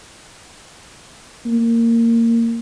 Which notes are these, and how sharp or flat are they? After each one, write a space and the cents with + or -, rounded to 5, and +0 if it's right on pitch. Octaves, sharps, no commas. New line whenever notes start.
A#3 -15